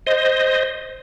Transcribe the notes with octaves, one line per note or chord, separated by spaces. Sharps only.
C5 D#5